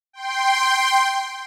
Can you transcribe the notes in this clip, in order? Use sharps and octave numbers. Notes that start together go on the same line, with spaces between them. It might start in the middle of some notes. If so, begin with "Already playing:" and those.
G5 C6